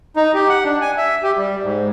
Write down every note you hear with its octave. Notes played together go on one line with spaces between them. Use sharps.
D#4
G4
F#5
D4
G#5
E5
G4
G3
G#2